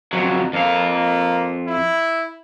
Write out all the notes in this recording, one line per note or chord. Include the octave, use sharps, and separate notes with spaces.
F2 F#3
F2 A#3 F5
A#3
E4